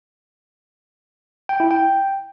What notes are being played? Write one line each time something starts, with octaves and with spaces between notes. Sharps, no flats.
G5
E4
G5